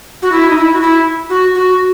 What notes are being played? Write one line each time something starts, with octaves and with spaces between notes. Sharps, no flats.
F#4
E4
D#4
E4
F#4
E4
F#4
F#4